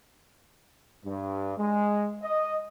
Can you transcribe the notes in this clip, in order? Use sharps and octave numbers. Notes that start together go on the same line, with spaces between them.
G2
G#3
D#5